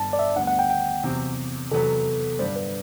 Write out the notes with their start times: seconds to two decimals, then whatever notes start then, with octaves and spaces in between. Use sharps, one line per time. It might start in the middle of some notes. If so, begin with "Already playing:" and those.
Already playing: G1 G2 D3 G3 D4 A5
0.13 D5
0.19 E5
0.36 D2 D3 G3 B3 F#5
0.47 F#5
0.59 G5
0.70 G5
1.03 E2 C3 F#3 C4 G4
1.72 E2 C3 F#3 B3 A4
2.39 G2 D3 G3 C5
2.56 B4